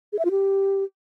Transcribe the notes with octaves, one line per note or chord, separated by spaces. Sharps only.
G#4
E5
F4
G4